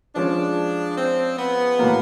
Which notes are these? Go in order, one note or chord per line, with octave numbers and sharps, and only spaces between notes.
F3 G#3 C#4 D4
C4
B3
A2 F#3 A#3